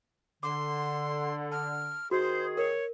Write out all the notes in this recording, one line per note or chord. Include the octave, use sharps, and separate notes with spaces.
D3 C6 D6
A5 F6
D#3 F#4 G#4 C5
A#4 C#5